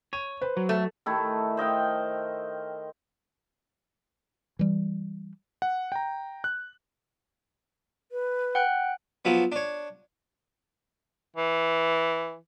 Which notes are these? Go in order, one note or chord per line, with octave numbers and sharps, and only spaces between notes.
C#5 D#7
B4 C5
F#3
A3
D#3 A3 E4 A4
C5 D#5 F5 G5
E3 G3
F#5
G5 A#5
F#6
B4
F#5 G5 F#6
F3 F#3 B3
D4 C#5
E3